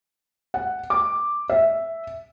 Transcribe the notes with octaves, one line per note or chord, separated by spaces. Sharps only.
F#5
D6
E5